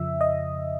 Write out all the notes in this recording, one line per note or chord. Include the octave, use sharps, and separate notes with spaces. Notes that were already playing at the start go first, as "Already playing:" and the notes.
Already playing: F2 C#3 F3 E5
D#5